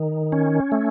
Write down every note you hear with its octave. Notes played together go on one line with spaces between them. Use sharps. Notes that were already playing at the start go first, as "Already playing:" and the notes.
Already playing: D#3
C#4
A3